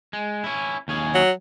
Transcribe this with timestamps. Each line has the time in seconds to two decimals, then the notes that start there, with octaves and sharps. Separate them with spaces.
0.13 G#3
0.44 C#4 E4
0.88 D#2 C#4 G#4
1.15 F#3